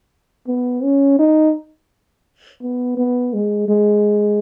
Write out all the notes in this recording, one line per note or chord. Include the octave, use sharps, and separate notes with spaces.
B3
C#4
D#4
B3
B3
G#3
G#3